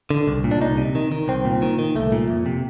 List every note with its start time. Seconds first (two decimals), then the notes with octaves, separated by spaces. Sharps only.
0.11 D3
0.27 C2
0.44 A#2
0.51 D4
0.61 C2 D#4
0.78 C3
0.95 D#3
1.12 D#3
1.28 C2 C4
1.45 A#2
1.62 D#3
1.79 D#3
1.95 C2 A3
2.12 A#2
2.30 F2
2.46 C3